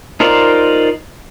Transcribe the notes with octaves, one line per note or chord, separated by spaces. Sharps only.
D#4 F4 A#4 C5 D5